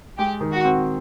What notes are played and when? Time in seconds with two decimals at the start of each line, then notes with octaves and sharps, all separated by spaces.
0.18 G#3 G4
0.40 D#3
0.53 F#4
0.64 C4